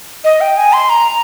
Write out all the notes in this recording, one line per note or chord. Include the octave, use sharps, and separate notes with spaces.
D#5
G5
G#5
C6
A#5